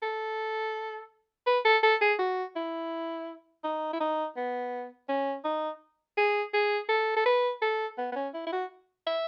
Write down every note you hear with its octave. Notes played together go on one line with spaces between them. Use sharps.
A4
B4
A4
A4
G#4
F#4
E4
D#4
E4
D#4
B3
C#4
D#4
G#4
G#4
A4
A4
B4
A4
B3
B3
C#4
E4
E4
F#4
E5